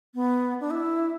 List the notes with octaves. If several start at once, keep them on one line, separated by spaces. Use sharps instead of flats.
B3
D4
E4